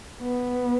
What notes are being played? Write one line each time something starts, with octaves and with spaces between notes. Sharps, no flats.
B3